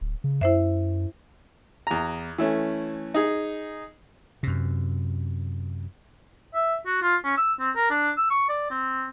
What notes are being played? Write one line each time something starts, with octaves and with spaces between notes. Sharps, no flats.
D1
C#3
F#2 E4 C5 E5
E2 A#5
E3 A3 C#4
D#4 G#4
F#2 C3
E5
F#4
F4
C#4
E6
C4
A#4
D4
E6
C#6
D5
C4